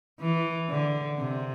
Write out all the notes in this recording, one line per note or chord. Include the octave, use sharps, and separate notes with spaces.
E3
D3
C3